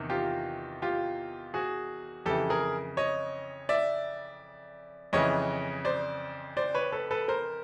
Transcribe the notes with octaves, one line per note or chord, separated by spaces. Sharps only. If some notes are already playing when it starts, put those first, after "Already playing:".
Already playing: E2 C3 D#3
F4 G4
F4 G4
F#4 G#4
F2 C#3 E3 G4 A4
G#4 A#4
C#5 D#5
D5 E5
F2 C#3 E3 C#5 D#5
C5 D5
C5 D5
B4 C#5
A4 B4
A4 B4
A#4 C5